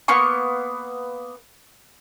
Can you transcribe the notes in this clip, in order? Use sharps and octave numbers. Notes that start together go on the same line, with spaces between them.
A#3 B3 C6 C#6